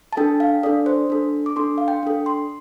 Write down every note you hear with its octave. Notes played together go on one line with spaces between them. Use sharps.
A5
D4 A4 G5
F5
D4 A4 D5
C5
D4 A4
D6
D4 A4 C6
F5
G5
D4 A4
C6